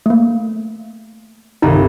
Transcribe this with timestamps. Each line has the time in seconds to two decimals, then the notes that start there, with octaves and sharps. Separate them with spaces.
0.06 A3 A#3
1.62 G1 C2 D#3 D#4